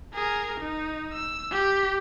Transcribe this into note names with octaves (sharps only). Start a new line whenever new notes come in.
G#4 A#4
D#4
E6
G4